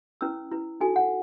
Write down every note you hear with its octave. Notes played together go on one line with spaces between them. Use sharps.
C#4 E4 B4 E6
E4 B4
D#4 F#4 A4 G#5
F#5